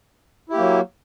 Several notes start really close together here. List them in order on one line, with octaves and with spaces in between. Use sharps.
E4 G4 A#3 F#3